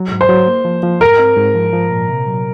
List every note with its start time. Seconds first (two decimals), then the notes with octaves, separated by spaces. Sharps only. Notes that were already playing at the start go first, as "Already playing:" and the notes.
Already playing: F#3
0.11 G#2
0.21 C5
0.29 F#3
0.47 A#3
0.65 F3
0.83 F3
1.00 G#2 A#4
1.19 C4
1.37 G#2
1.54 F3
1.73 F3
1.90 A#2
2.08 C3
2.27 F#3